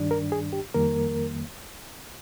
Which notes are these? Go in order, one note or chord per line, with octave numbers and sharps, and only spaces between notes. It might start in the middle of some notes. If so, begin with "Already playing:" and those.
Already playing: G2 D#3 G3 D4
A#4
G#4
G4
F2 D#3 G3 A#3 A#4